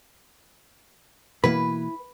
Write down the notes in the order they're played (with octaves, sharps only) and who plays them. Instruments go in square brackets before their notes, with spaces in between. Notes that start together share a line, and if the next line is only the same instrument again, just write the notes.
[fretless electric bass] B2 E3 A#3 [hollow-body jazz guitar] E4 B5 [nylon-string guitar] B4